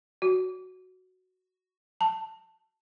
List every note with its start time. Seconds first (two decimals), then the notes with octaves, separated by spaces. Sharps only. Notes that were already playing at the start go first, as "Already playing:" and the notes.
0.22 F#4
2.01 A5